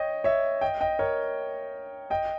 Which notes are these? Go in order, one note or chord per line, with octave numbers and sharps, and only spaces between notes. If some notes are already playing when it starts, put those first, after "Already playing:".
Already playing: C#5 D#5 G5
C#5 E5
D#5 G5
D#5 G5
A#4 C#5
D#5 G5